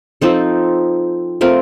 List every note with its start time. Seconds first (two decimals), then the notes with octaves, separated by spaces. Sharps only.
0.21 F3 C4 D#4 A4
1.41 A3 C4 F4 A#4